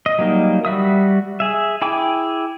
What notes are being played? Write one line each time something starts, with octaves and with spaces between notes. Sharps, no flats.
D#5
F#3 G3 A#3 D#4
G3 F#4 E5 D#6
G#4 E5
E4 G#4 G5 D6